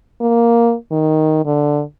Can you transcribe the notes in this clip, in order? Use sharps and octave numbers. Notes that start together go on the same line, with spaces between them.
A#3
D#3
D3